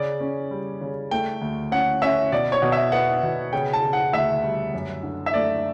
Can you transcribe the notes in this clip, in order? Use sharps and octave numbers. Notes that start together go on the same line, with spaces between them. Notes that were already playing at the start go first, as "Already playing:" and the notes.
Already playing: C#3 D5
C#4
G3
C#3
A3 G5
D2
C#4 F#5
C#4 E5
B2 D5
C#5
B2
E5
B3 F#5
B2
C#3 G5
A5
C#3
F#5
D2 E5
G3
F#2
D3
E5
A3 D5